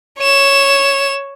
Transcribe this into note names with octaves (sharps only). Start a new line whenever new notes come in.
C#5 E7